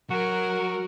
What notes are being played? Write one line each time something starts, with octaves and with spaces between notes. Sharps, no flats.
F#3 F#4 A#4